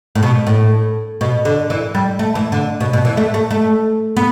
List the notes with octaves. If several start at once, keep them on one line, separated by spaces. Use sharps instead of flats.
A2
B2
A2
B2
D3
E3
G3
A3
E3
D3
B2
B2
E3
A3
A3
A3
B3